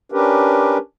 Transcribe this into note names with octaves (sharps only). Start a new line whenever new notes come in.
C#4 D4 G4 A#4 B4